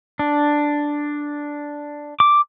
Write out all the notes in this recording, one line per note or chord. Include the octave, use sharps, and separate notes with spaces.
D4
D6